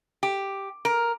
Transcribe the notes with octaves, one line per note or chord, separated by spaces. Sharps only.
G4
A#4